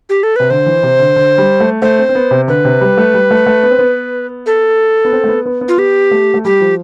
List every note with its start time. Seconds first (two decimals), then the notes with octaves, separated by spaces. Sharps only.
0.09 G4
0.23 A4
0.36 C3 B4
0.50 D3 C5
0.66 E3
0.83 C3
0.99 D3
1.16 D3
1.38 G3
1.60 A3
1.82 A3 C5
1.99 C4
2.09 C4
2.15 B3
2.31 C3
2.48 D3 B4
2.65 C3
2.81 G3
2.98 A3
3.14 G3
3.31 A3
3.46 A3
3.63 B3
3.71 C4
3.79 B3
4.46 A4
5.05 B3
5.12 C4
5.24 A3
5.28 B3
5.46 B3
5.61 B3
5.68 F4
5.78 B3 G4
6.11 A3
6.34 A3
6.45 G3 G4
6.61 F3